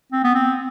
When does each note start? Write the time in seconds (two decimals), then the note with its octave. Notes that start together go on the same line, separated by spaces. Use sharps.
0.12 C4
0.24 B3
0.35 C4